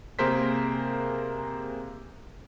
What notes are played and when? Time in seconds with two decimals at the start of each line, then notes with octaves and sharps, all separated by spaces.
0.19 C3 A#3 G#4 A#4 C5 B6